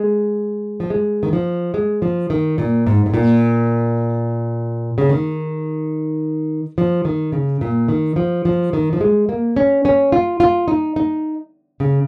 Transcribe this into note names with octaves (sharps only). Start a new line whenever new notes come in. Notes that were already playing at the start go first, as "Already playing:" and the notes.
Already playing: G#3
F3
G#3
D#3
F3
G#3
F3
D#3
A#2
G#2
G#2
A#2
C#3
D#3
F3
D#3
C#3
A#2
D#3
F3
F3
D#3
F3
G#3
A#3
C#4
C#4
F4
F4
D#4
D#4
C#3